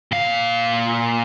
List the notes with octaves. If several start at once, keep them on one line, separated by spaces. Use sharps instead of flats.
A#2 F5